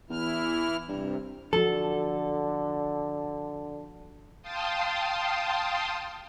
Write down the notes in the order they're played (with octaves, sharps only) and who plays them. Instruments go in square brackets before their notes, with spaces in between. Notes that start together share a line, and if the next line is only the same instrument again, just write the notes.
[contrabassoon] E2 [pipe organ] E3 E4 F6
[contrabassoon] G2 [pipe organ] C3
[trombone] D3 [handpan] F3 F#4 [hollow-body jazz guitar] A4
[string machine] F5 G5 A5 C6 D#6